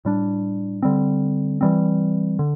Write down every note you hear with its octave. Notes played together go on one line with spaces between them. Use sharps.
A2 G3 D4
D3 G3 C4
E3 G3 C4
D3